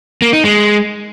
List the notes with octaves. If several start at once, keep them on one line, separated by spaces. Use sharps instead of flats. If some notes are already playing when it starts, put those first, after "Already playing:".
A#3
D#4
G#3